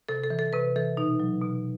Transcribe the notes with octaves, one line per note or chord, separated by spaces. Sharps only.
C3 A4
A4
E3
A4
C3 B4
E3 A4
B2 D#4
F#3
B2